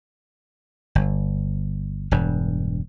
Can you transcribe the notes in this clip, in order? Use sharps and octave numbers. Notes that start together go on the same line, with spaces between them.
G1
E1 G2